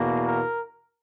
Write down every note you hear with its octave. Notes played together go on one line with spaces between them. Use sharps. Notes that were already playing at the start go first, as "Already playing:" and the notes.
Already playing: E2 B2 A#3
A#4